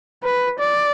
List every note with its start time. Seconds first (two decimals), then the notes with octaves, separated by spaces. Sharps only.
0.23 B4
0.60 D5